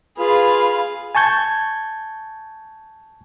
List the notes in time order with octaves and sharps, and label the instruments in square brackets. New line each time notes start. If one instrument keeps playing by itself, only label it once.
[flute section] F4 B4 B5 [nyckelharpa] G#4 F5
[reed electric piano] G#5 A5 C#6 G6 G#6